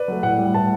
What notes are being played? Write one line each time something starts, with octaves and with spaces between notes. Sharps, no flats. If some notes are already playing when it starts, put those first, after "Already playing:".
Already playing: B4 D5
F#3 A3
A2 F#5
G3
A2 A5